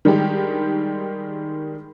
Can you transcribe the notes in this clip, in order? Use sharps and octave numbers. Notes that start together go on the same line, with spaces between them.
D#3 G3 G#3 G4